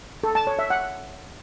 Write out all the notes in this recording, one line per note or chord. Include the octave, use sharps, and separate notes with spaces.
A4
A5
C#5
E5
F#5